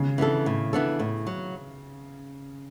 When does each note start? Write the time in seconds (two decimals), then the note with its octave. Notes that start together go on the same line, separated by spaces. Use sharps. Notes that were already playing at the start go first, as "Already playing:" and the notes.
Already playing: C#3
0.18 E3 B3 D4 A4
0.46 A2
0.73 E3 B3 D4 A4
0.99 A2
1.27 F#3